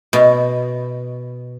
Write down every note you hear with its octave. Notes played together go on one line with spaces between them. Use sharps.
B2